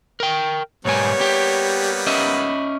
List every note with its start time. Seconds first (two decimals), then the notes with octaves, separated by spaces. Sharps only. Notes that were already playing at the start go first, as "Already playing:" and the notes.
0.20 A#4 G5
0.85 B1 G#2 G3 A#3 B3 C#5 G#5
1.21 G4
2.07 C#4 D#5 E5 B5